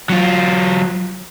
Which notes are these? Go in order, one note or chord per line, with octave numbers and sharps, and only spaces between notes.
F#3 F4